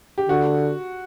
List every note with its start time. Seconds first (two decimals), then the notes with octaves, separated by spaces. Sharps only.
0.18 G4
0.29 D3 F#4